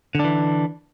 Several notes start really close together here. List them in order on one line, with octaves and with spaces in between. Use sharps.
D3 D4 E3